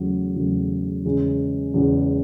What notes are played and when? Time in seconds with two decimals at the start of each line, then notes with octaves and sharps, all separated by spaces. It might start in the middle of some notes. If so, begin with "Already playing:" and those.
Already playing: E2 C#3 F#3 A3
0.35 E2 C#3 F#3 A3
1.05 E2 C#3 G#3
1.74 E2 C#3 G#3